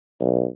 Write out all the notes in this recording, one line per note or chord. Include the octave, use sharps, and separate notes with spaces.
B1